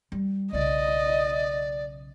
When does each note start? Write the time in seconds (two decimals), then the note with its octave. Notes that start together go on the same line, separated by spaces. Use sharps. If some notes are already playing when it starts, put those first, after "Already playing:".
0.12 G3
0.53 B1 C#3 D5 D#5